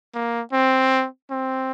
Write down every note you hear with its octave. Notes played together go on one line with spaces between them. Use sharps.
A#3
C4
C4